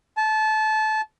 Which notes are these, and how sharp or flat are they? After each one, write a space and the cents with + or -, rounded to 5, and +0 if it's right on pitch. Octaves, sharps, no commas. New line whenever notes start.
A5 -25